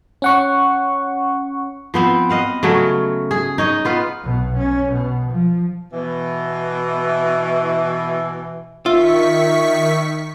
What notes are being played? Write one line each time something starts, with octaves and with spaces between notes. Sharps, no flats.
C#4 F#5 C#6
F3 B3 C4
D#5 F5 F#5
C#3 F#3 A3 C#5
G#4
D#4 C#5 D#5
B3 F4 B4
B1 B2
C#4
B2
F3
B2 E3
D#3 F4 E5 C#6 B6